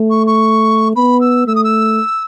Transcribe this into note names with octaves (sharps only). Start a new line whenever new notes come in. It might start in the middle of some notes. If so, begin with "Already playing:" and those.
Already playing: A3
C#6
C#6
B3 B5
E6
A3 E6
D#6
E6